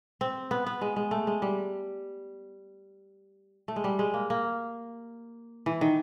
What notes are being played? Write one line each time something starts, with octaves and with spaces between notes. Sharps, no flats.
C4
B3
B3
G#3
G#3
A3
G#3
G3
A3
G#3
G3
G#3
A#3
A#3
E3
D#3